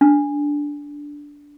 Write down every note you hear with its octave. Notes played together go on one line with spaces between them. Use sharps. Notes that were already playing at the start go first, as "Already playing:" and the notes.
D4